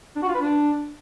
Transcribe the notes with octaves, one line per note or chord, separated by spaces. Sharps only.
D4
F#4
F4
B4
D4